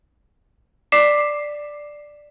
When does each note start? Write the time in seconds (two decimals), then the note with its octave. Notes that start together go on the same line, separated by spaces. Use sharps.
0.92 D5 D6 B6 C7 E7